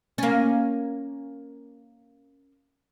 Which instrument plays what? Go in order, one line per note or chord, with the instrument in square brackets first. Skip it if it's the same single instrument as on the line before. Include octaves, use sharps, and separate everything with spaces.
[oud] A#3 C#4